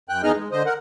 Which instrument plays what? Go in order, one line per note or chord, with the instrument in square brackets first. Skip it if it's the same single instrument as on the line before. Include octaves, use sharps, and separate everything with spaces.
[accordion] F#2 G5 F#6
E2 B3 D#4 G#4 D#5 F6
G#3
D3 C5 D#5
A#4 F#5